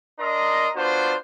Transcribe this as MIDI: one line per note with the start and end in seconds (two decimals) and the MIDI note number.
0.20 0.70 62
0.20 0.70 70
0.20 0.70 75
0.20 0.70 82
0.20 0.70 84
0.20 0.70 87
0.76 1.14 59
0.76 1.14 62
0.76 1.14 65
0.76 1.14 66
0.76 1.14 72